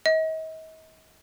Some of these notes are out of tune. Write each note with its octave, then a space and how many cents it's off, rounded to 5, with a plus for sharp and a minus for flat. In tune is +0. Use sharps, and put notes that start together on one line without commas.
D#5 +40